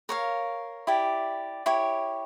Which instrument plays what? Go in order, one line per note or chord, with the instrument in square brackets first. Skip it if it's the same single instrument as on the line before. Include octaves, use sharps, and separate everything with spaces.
[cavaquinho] A#4 C#5 F5
E4 G4 D5
E4 G4 C#5